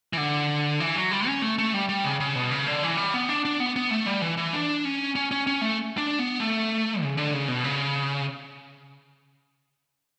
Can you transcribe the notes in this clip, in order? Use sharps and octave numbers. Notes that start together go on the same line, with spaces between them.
E3
D3
E3
F#3
G3
C#4
A3
A3
G3
G3
C#3
C#3
B2
C#3
D3
E3
G3
B3
D4
D4
B3
B3
A3
G3
E3
E3
D4
C#4
C#4
C#4
C#4
A3
D4
B3
A3
C#3
D3
C#3
B2
C#3